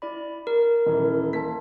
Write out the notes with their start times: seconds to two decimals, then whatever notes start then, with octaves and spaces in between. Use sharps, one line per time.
0.02 E4 D5 B5
0.47 A#4
0.86 D#1 E3
1.33 A#3 A5 B6